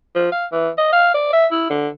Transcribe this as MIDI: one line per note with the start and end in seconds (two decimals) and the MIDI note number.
0.16 0.31 53
0.32 0.46 77
0.52 0.69 52
0.78 0.92 75
0.92 1.11 77
1.14 1.32 74
1.33 1.47 76
1.52 1.68 64
1.70 1.88 50